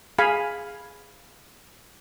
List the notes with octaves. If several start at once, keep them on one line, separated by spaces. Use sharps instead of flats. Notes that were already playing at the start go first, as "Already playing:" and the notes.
G#4 F5 G#5 B5